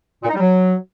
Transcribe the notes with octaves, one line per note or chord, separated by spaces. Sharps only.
A#2
D#4
G3
F#3